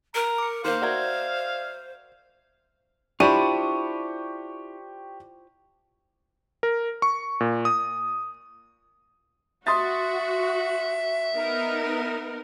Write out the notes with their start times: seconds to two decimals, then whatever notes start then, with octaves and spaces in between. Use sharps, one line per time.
0.15 A#4 A#5
0.38 D6 C#7
0.64 D#3 A#3 C5 F5 C6 G6
0.82 F#4 A#4 D5 E5 G#6
3.20 D4 E4 F4 G4 C5 B5 C#6 D#7
6.63 A#4
7.02 C#6
7.40 A#2
7.65 D#6
9.67 F#4 E5 C6 D#6 A6
11.34 B3 D#4 A#4